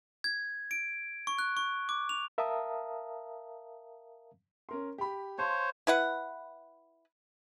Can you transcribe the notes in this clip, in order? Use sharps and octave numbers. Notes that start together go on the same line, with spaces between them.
G#6
D7
C#6
F#6
C#6
D6
F7
A#4 E5 F5 A5 A#5 D#6
C#4 A#4 C6
G4 B5
C5 C#5 F5 A5 C6
E4 B4 F#5